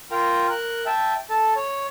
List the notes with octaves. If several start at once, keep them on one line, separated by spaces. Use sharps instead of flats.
F4 A#4 G5 A#5
A#4 F#6
E5 G5 A5
A4 A5
C#5